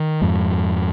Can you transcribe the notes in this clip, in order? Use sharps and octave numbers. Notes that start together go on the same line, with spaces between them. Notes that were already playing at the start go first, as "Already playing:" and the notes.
Already playing: D#3
F2 G#2